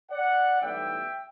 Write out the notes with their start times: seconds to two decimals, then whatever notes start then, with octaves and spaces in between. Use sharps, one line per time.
0.11 D5 F#5
0.62 B1 A2 E3 G3 B3 E5 G5